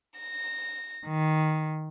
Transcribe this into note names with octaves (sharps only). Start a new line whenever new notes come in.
A#6
D#3